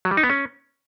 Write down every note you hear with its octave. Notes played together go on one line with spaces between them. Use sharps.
F#3
G3
D#4
B3
C#4